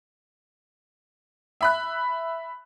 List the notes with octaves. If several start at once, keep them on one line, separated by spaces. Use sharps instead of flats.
E5 B5 F#6